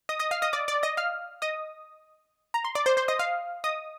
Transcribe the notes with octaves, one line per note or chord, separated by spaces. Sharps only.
D#5 D#6
D#5 D#6
F5 F6
D#5 D#6
D5 D6
D5 D6
D#5 D#6
F5 F6
D#5 D#6
A#5
C6
D5 D6
C5 C6
C5 C6
D#5 D#6
F5 F6
D#5 D#6